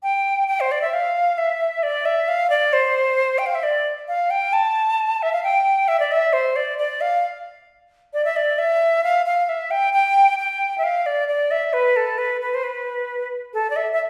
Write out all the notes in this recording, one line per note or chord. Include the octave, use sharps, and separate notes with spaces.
G5
G5
C5
D5
E5
F5
E5
D5
E5
F5
D5
C5
G5
F5
E5
D5
F5
G5
A5
E5
F5
G5
E5
D5
E5
C5
D5
D5
F5
D5
E5
D5
E5
F5
F5
E5
G5
G5
G5
E5
F5
D5
D5
E5
B4
A4
B4
B4
C5
B4
A4
D5
E5
E5